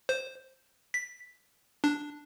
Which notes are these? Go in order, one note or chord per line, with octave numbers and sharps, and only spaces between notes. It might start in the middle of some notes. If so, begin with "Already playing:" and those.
C5
B6
D4